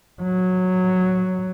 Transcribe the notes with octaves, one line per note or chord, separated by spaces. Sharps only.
F#3